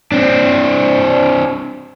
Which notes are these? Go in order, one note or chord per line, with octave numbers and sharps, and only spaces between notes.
C4 D4